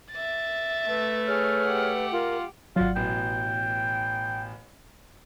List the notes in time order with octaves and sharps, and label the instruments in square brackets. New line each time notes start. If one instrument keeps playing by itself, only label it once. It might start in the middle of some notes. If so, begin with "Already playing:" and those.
[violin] E5 A6
[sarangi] A3 [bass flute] B4
[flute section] G#4 C#5 F6
[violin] G4 F#5
[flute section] F4 [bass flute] A#4
[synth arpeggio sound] G#1 F#3 [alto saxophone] F4 [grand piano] D5 F#5
[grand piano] A1 B2 E3 [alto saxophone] G5